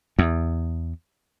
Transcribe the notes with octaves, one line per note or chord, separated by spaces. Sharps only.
E2